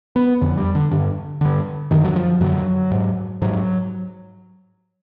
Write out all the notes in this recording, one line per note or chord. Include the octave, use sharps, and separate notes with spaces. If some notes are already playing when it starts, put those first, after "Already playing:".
B3
F2 D3
G3
D3
G2 D3
G2 D3
F#2 D3 D#3
F#3
F3
F#2 D3 F#3
G#2
G#2 F#3